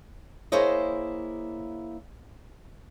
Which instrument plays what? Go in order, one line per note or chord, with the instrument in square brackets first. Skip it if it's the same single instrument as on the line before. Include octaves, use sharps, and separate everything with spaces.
[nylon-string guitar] A#3 E4 G#4 C5 C#5 D#5